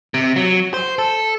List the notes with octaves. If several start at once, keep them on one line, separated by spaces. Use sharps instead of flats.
C3
F#3
C5
A4